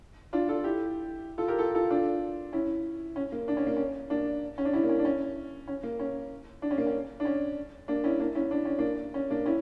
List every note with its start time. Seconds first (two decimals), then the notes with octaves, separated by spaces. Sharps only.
0.33 D4 F4
0.48 F4 A4
0.64 E4 G4
1.38 F4 A4
1.48 G4 A#4
1.59 F4 A4
1.75 F4 A4
1.90 D4 F4
2.53 C#4 E4
3.16 C#4
3.32 A#3
3.48 D4
3.57 C#4
3.67 A#3
3.76 C#4
4.10 A#3 D4
4.58 C#4
4.65 D4
4.73 C#4 E4
4.83 A#3
4.89 C#4
4.99 D4
5.05 C#4
5.68 C#4
5.83 A#3
5.99 C#4
6.62 D4
6.71 C#4
6.78 A#3
6.86 C#4
7.20 D4
7.25 C#4
7.88 A#3 D4
8.04 C#4 E4
8.20 A#3 D4
8.35 C#4 E4
8.51 D4
8.65 C#4
8.79 A#3 D4
9.14 C#4
9.30 A#3 D4
9.46 C#4 E4